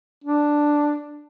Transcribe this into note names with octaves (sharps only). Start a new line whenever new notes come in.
D4